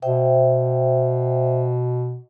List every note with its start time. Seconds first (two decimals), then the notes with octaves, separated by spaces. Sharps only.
0.02 B2 C5 E5 G5